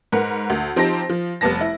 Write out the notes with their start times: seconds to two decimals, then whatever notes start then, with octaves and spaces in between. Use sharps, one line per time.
0.12 G#2 A#4 B4 F#5
0.50 D2
0.76 F3 C4 D#4 G4 A5 A#6
1.09 F3
1.41 F1 G3 B3 A5 A#6
1.61 E4